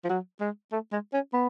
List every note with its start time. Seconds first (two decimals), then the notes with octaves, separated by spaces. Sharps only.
0.05 F3
0.10 F#3
0.41 G#3
0.72 A3
0.92 G#3
1.14 C#4
1.34 B3